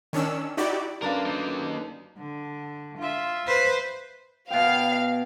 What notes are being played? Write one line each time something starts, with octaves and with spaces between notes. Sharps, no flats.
D#3 C#4 D4 E6
D#4 E4 F#4 G4 D5
F#2 D3 D4 A#4 B4 F5
A#3 D#4
D3
F4 E5
B4 C5
B2 F5 G5